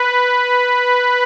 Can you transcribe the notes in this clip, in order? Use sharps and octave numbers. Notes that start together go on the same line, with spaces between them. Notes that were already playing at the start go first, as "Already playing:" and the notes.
Already playing: B4